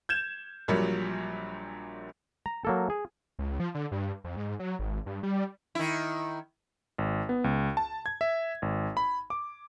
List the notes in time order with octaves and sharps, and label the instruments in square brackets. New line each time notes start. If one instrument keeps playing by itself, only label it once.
[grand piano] G6 G#6 E7
A#1 A#2 F#3 G3
[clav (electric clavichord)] A#5
F#3 A#3 A4
G#4
[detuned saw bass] C#2
F3
D3
G2
F2
G#2
F#3
G#1
G2
G3
[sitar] D#3 E4
[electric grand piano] G#1
B3
C#2
A5
G#6
E5
G#1
B5
D6